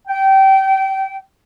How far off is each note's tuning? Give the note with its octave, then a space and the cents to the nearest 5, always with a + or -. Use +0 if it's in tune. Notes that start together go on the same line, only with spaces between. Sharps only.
G5 -25